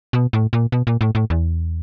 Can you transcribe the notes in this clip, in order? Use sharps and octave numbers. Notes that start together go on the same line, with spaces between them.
B2
A2
A#2
B2
A#2
A2
A2
E2